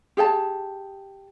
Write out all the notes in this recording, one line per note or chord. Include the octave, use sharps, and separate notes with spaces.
G4 G#4 G5 A5